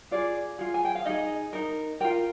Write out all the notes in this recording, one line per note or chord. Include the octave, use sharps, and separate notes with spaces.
F4 G#4 D5
F4 G#4
G#5
G5
F5
D#4 G#4 D#5
D#4 A#4
F4 A#4 G5